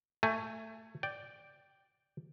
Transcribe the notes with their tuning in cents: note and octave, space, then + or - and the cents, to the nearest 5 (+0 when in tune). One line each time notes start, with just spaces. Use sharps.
A3 +15 G#5 +0
D5 +0 G5 +0